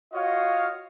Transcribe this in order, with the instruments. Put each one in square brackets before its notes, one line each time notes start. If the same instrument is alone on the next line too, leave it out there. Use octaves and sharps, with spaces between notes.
[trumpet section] F4 F#4 C#5 D#5 F5